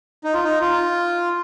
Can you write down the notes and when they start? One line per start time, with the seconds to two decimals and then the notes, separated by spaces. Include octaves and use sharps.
0.24 D#4
0.34 F4
0.44 D#4
0.61 F4